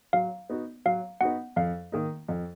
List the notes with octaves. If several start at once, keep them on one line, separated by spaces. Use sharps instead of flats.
F#3 F5
B3 D#4 F#4
F#3 F5
B3 D#4 F#4 F#5
F2 F5
D#3 A#3 D#4
F2